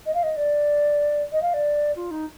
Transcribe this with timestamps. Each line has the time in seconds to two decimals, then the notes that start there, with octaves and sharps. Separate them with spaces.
0.06 D#5
0.14 F5
0.23 D#5
0.37 D5
1.32 D#5
1.42 F5
1.54 D5
1.96 F4
2.11 D#4